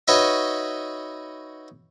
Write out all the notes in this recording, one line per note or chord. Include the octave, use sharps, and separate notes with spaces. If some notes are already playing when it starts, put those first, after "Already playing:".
D#4 F#4 B4 C#5 D#5 E5